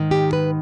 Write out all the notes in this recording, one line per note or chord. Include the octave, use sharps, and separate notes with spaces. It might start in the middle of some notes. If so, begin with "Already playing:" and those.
Already playing: G#2 D#3
G4
B4